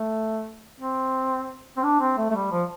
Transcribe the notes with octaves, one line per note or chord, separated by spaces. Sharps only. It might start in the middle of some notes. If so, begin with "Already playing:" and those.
Already playing: A3
C4
C4
D4
C4
A3
A3
G3
F3